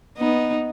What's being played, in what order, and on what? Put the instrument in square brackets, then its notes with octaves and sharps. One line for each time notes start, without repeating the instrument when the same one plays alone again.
[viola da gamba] B3 D#4